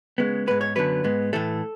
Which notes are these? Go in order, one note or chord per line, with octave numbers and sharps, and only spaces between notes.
C#3 G#3 B3
G#2 G#3 B3 B4
C#5
F#2 D3 F#3 B3 B4
G#2 G#3 B3
A2 E3 A3 A4